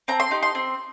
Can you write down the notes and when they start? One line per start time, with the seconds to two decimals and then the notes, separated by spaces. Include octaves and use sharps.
0.08 C4 A#5
0.20 C6
0.31 D#4 G4
0.43 C6
0.55 C4